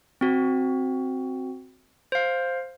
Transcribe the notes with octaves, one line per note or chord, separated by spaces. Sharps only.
C4 F#4
C5 F5